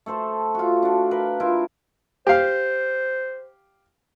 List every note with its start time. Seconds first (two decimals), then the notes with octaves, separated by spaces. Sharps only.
0.06 A3 A4 C5 A5
0.55 F4 F#4
0.83 D4 F#4
1.11 A#4 B4 F5
1.40 E4 F4 A#4
2.27 G4 C5 F5